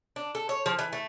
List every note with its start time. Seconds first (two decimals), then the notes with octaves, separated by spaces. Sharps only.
0.16 D4
0.35 A4
0.49 C#5
0.66 F3
0.79 E3
0.93 A3